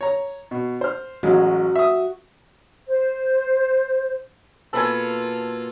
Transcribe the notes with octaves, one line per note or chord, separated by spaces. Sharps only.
C#5 A#5
B2
C5 F6
A1 F#3 G#3 F#4
E5 D#6
C5
B2 A#3 F4 A4 B4 G#5 F#6